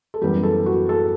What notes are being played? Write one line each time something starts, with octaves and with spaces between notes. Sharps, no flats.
A4
F#2 E3 G3 B3 G4
A4
F#4
A4